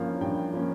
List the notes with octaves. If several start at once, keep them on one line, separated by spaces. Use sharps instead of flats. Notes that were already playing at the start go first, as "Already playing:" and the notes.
Already playing: G2 F3 A#3 C#4 F5
G2 G5
F3 A#3 C#4